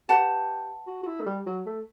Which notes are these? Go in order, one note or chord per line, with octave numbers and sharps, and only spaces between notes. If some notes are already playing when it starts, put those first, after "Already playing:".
G4 B4 F#5 A5
F#4
F#4
E4
A3
G3
F#3
A3